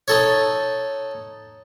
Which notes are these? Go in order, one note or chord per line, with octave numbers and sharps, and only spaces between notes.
D#4 A4 C#5